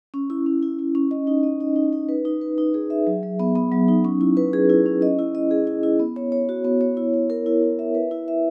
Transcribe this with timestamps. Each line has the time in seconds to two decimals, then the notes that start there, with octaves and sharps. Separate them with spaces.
0.14 C#4
0.30 E4
0.46 C#4
0.63 E4
0.79 E4
0.95 C#4
1.11 D#5
1.27 D#4
1.43 D#5
1.60 D#4
1.76 D#4
1.93 D#4
2.09 B4
2.25 D#4
2.41 B4
2.58 D#4
2.74 G#4
2.90 E5
3.07 F#3
3.23 F#3
3.40 B3
3.55 B3
3.72 F#3
3.88 D#4
4.04 C#4
4.21 E4
4.37 B4
4.53 G#4
4.70 E4
4.86 C#4
5.02 D#5
5.19 E4
5.35 D#5
5.51 G#4
5.67 E4
5.83 E4
5.99 B3
6.16 C#5
6.32 C#5
6.49 F#4
6.64 B3
6.81 C#5
6.97 E4
7.14 E4
7.30 A#4
7.46 E4
7.63 E4
7.79 E5
7.95 B4
8.11 E4
8.28 E5